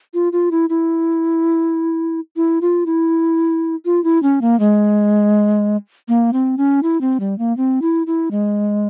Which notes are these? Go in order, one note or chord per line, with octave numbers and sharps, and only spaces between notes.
F4
F4
E4
E4
E4
F4
E4
F4
E4
C#4
A#3
G#3
A#3
C4
C#4
E4
C4
G3
A#3
C4
E4
E4
G#3